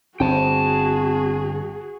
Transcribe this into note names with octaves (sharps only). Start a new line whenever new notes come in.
G1 C4 F#4 G#4 G5 A5